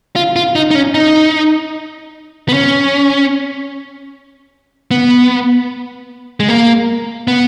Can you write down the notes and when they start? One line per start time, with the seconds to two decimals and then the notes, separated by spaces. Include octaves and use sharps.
0.16 F4
0.36 F4
0.55 D#4
0.71 D#4
0.75 C#4
0.94 D#4
2.49 B3
2.53 C#4
4.91 B3
6.40 G#3
6.48 A#3
7.28 B3